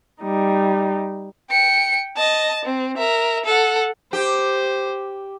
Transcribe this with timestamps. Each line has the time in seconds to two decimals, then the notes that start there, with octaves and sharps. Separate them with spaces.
0.21 G3 D#4
1.50 G5 C#7
2.17 D#5 A5
2.65 C4
2.97 A#4 E5
3.45 A4 F#5
4.13 G4 C5